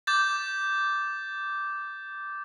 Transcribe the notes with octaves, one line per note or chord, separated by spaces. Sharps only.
D6 G6 A6